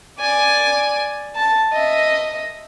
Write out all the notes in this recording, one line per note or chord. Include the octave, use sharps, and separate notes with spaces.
D5 G#5
A5
D#5 E5